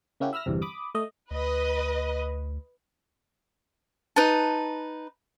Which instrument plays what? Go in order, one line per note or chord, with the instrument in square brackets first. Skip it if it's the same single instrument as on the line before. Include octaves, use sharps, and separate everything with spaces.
[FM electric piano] C#3 A#3 C#4 E4 F#4 G4
E5 B5 E6 F6 A#6
G1 E2 G2 C3
B5 D6 D#6
A3 D#5
[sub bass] D2 [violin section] B4 D#5
[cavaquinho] D#4 B4 A5